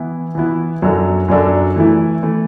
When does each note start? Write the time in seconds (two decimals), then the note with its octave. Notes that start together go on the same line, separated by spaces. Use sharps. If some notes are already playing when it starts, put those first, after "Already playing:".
Already playing: E3 B3 E4
0.35 E3 B3 E4
0.82 F#2 F#3 D4 A4
1.28 F#2 F#3 D4 A4
1.76 E3 A3 E4
2.23 E3 A3 E4